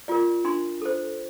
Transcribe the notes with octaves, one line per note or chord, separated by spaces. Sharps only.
F4 A#4 D5
D4 C6
A4 C5